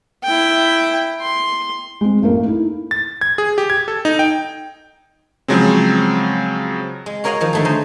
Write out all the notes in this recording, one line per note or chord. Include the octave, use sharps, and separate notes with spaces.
E4 G5
C6
G#3 C4
A1 A3 A#3 A#4
D#4 E4
A6
G#6
G#4
G4
G#6
A4
D#4
G5
C#3 F3 F#3 G#3 C4
G#3
F#4 A#4 C#5 D#5 F5 F#5
D#3 F3
D3 A3 G#4
D#4 C5 D#5